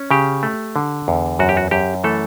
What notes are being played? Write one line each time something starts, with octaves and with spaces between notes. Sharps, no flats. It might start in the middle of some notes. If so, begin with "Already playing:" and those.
Already playing: C#4
C#3 G4
A3
D3
E2
F#2 F#4
G4
F#4
F#2 G4
E3 A3 A4